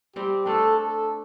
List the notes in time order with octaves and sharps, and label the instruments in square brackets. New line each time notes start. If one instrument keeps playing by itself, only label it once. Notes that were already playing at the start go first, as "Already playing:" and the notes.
[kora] G3 C4 [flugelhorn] G4
[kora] A3 D4 [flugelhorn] A4
[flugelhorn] A4